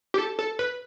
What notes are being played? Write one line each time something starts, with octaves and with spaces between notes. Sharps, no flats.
G4
A4
A4
B4